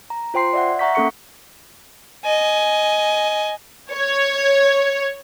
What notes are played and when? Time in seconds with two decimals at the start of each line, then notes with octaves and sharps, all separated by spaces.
0.10 A#5
0.34 F4 C5 G5 C6 C7
0.53 D5 E5 F#5
0.79 E5 F#5 A#5 C#6 G6 B6
0.95 A#3 C#4 A4 C#6 C#7
2.24 D#5 G#5
3.92 C#5